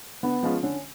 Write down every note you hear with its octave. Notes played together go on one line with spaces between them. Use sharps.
D3 B3
F3 G#3 C#4 F4
D3 C#4